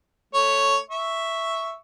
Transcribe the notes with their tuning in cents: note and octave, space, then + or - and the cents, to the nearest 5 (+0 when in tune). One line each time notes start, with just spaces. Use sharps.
A3 +0 C#5 +0
E5 +0 C#6 +0